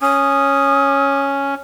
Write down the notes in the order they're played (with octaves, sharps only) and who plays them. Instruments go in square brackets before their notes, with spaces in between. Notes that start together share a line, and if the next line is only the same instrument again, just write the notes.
[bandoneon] C#4 [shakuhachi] D#6